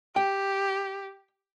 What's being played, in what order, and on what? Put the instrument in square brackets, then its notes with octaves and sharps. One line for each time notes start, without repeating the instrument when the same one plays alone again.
[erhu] G4 [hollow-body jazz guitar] G5